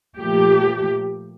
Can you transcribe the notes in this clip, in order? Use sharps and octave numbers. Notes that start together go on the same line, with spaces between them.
A#2 F3 A3 G4